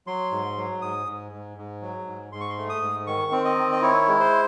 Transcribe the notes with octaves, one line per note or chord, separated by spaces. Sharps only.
F#3 C6
G#2
F#3
G#2 D#6
G#2
G#2
G#2
F#3
G#2
G#2 C6
C#6
C6
A3
D#6
G#2
D#3 C#6
C4
D#5
D#3
D#5
E4 C#5
G#3
C5